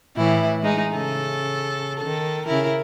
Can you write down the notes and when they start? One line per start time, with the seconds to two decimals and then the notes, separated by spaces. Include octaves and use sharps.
0.16 A2 E3 E4
0.63 G#3 D#4
0.92 C#3 A4
1.99 D#3 A4
2.46 C#3 E4 A#4